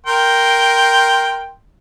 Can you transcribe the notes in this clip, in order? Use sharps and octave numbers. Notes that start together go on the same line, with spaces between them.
A#4 G5 C6